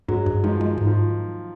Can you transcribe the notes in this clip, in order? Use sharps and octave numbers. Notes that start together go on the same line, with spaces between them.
G2 F#3 G#3
G2
D#3 F3 G#3
G#3
G#2
D#3 F3